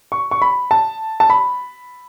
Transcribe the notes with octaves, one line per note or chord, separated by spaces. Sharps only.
C#6
C#6
B5
A5
A5
B5